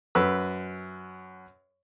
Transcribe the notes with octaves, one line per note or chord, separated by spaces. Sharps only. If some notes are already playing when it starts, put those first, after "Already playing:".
F#2 B4 E6